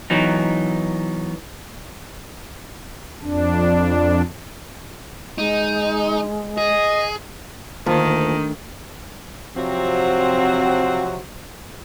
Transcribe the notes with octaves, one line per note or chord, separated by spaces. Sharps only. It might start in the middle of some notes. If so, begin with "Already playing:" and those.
E3 F#3 B3 D#4
F2 D4
G#3 D#4
G#4 D#5
D2 D#3 A#3 F4 A5
C3 F3 F#3 C4 F#4